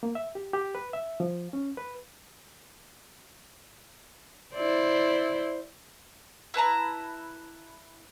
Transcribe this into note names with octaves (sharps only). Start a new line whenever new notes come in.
A#3
E5
G4
G4
B4
E5
F3
C#4
B4
E4 C5 D5
E4 B4 A5 A#5